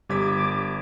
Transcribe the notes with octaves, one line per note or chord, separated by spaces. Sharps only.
G1 G3 D6 G#6 B6